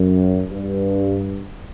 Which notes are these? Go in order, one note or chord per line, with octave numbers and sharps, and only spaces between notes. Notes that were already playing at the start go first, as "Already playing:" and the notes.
Already playing: F#2
G2